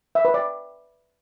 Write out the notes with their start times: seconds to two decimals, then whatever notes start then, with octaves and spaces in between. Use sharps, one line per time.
0.15 E5
0.25 B4
0.34 D5